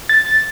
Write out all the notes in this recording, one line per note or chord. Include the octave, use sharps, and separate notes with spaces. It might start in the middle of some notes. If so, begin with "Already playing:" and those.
A6